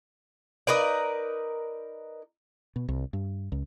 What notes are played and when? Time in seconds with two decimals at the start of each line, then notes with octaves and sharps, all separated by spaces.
0.67 D#4 A#4 B4 D5
2.76 B2
2.88 C2
3.13 G2
3.52 C#2